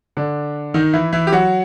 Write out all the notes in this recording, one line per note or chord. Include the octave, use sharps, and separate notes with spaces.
D3 D4
D#3 D#4
E3 E4
E3 E4
G4
F#3 F#4